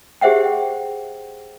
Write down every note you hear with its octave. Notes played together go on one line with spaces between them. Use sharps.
G4 G#4 C5 E5 F#5 G5